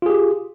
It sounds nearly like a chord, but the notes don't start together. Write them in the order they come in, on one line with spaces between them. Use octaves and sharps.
F4 G#4 G4